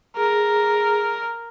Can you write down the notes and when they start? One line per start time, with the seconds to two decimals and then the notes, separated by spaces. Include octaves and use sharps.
0.17 G#4 A#4